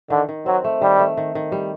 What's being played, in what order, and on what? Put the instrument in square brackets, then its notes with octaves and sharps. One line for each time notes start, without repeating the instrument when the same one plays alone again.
[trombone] D3 [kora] D#3
[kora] D#3
[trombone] F#3 [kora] C4
[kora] A3
[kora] D#3 [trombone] G3
[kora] A3
D#3
D#3
G3